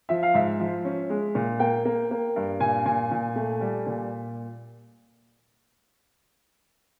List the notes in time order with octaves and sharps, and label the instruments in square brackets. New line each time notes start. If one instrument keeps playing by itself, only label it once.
[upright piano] F3 E5
F5
G#2 E5
F3
C#4
G#3
A#2
A#3 G5
A#3
A#3
G2
A#2 G#5
A#2 G#5
A#2
A3
G3
A#2